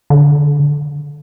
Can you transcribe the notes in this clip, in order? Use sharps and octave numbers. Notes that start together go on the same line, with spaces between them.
D3